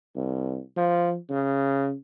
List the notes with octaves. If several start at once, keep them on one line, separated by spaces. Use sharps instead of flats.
C2
F3
C#3